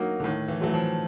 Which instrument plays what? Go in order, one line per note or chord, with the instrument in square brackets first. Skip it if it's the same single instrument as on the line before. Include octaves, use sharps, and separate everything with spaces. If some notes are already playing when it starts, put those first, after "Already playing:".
Already playing: [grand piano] F#3 A#3 D#4 F#4
[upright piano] D3
[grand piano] A2 [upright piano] D#3
[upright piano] E3
[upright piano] E3 [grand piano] F#3 A3
[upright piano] F3